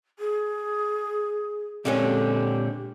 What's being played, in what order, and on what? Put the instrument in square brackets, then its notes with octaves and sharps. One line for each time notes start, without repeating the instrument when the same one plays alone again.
[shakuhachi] G#4
[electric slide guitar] A#2 A#3 C4 [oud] D3 G#3 C#4 [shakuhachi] G4